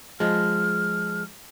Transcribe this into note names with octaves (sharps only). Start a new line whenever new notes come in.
F3 G#3 F6